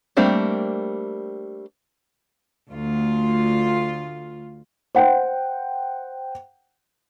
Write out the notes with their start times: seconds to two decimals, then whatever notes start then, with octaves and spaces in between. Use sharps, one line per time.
0.17 G3 A3 A#3 C4 D4
2.70 D2 F4
4.95 C5 F#5 G5